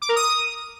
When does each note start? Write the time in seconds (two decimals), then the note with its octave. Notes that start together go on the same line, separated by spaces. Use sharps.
0.02 D6
0.09 A#4
0.16 D#6